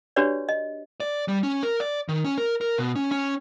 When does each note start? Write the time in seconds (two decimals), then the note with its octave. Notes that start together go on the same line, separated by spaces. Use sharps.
0.16 D4 F#4 G4 B4 C#5 D5
0.49 D#5
1.00 D5
1.28 G3
1.43 C#4
1.63 A#4
1.80 D5
2.09 D#3
2.25 C#4
2.38 A#4
2.61 A#4
2.78 B2
2.96 C#4
3.11 C#4